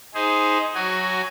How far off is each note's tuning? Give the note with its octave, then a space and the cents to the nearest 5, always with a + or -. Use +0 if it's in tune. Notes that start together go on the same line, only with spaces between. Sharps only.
D#4 +15 G#4 +0 C5 +0
F#3 +0 F#4 +15 G#5 +0